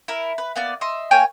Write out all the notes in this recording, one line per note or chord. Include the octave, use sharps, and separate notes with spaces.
E4 A#4
B4
A#3 B3 D5
D#5 E5 C6
A#3 C#5 G5 G#5